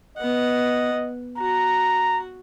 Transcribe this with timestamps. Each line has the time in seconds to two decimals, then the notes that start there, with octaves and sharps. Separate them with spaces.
0.18 B3 D#5 F#5
1.38 F#4 A#5